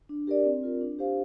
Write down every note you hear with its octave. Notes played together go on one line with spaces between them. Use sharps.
D4
G4 A#4 D5
C4
F4 A#4
D4
G4 C5 F5